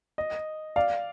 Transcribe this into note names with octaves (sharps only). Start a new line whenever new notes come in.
D#5
D5 F5